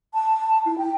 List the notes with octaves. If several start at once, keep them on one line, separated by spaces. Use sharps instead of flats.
A5
E4
G5